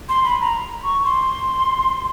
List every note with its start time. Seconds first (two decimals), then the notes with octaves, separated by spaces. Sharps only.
0.09 C6
0.25 B5
0.41 A#5
0.84 C#6
1.05 C6